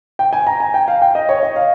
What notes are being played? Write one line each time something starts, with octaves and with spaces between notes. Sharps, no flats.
G5
G#5
A#5
G#5
G5
F5
G5
D#5
C#5
D#5
F5